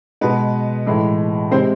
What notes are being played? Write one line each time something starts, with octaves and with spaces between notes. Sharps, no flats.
B2 G#3 B3 B4
A2 E3 G#3
C3 G#3 C4 C5